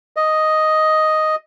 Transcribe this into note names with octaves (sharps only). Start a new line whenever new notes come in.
D#5